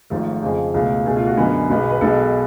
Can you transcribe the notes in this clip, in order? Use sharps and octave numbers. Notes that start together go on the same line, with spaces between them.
G#1 G#2 F3 A3
F2 C#3 G#3
C#2 B2 A3 G#4
C#2 B2 A3 G#4
F4
F#4
F#2 D3 G#3 B3 G#4
B1 B2 G#3 B3
B4
B1 B2 G#3 B3 A4